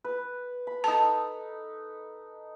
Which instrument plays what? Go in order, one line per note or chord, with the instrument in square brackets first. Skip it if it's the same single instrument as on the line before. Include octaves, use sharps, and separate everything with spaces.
[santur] B4
B5
[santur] D#4 A4 [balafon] A5